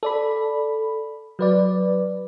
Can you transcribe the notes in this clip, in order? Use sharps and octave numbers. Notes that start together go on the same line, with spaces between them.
A4 D5 B5
F#3 B4 D5